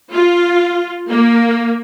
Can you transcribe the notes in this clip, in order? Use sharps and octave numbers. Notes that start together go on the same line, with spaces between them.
F4
A#3